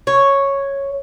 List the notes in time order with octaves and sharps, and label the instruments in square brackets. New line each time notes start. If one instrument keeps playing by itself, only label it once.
[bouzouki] C#5